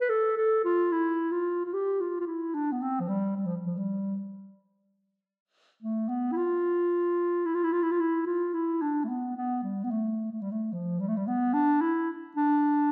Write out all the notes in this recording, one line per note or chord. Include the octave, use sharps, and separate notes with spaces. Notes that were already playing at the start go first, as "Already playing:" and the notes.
B4
A4
A4
F4
E4
F4
F4
G4
F4
F4
E4
D4
B3
C4
F3
G3
G3
F3
F3
G3
A3
B3
E4
F4
E4
F4
E4
F4
E4
F4
E4
F4
E4
D4
A3
B3
B3
G3
B3
A3
A3
G3
A3
F3
G3
A3
G3
B3
D4
E4
D4